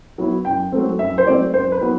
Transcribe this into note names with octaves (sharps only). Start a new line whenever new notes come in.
F#3 B3 E4
F#2 G5
F#3 A3 C4
F#2 E5
C5
F#3 A3 C4 D5
F#2 C5
B4
F#3 B3